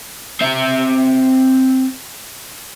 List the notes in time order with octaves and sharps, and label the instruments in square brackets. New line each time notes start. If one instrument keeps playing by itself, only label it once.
[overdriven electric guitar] C4 E5